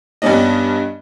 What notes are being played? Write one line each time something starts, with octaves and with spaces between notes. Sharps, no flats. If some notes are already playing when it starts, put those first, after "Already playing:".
G2 G3 B3 C#4 D4 D#5